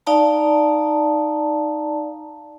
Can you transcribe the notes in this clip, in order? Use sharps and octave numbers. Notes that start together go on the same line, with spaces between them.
D#4 D5 F5 A5 A#5